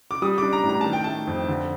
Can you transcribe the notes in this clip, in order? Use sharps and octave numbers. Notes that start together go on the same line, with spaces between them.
D6
G3 D#6
D6
D4
A#5
A2
A#5
D#3 A5
G5
A3 A5
F2
D3